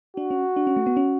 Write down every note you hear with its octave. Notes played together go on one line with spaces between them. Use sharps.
D4 F#4
C#4
D4
C#4
A3
B3
C#4